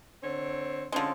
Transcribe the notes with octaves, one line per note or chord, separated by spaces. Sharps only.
D3 C4 C#5
D3 F3 G#3 C4 C#4